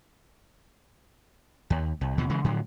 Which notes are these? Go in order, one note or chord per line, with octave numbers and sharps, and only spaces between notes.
D#2
C2
D#2 B2 D3 F3
C#3 E3 G#3
A2 D3 F3 F#3